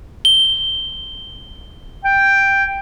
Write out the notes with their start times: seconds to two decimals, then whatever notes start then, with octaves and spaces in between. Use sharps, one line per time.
0.25 G7
2.04 G5